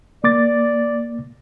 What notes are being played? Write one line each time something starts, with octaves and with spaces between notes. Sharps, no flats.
A#3 D5 D6 A6